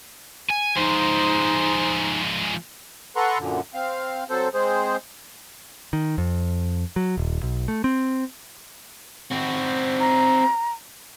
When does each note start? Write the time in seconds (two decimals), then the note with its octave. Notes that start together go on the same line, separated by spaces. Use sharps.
0.49 G#5
0.76 F3 G#3 D#4 C5
3.16 A4 B4 F#5 A#5 C6 C#6
3.39 F#2 A#2 D3
3.74 C4 F5
4.30 F#3 C4 A4 C5
4.54 G#3 C4 G#4 C5
5.93 D#3
6.18 F2
6.96 F#3
7.18 D#1
7.43 B1
7.68 A3
7.84 C4
9.31 C4 F#4
10.00 A#5